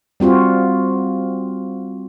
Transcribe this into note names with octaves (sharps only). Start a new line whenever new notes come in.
G3 C4 F4 F#4